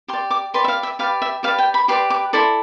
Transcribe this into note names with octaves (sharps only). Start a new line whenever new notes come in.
G4 D5 C6
D6
G4 B4 D5 C6
E5
F5
E5
G4 B4 D5 F5
E5
G4 B4 D5 F5
G5
B5
G4 B4 D5 C6
D6
E4 A4 D5 C6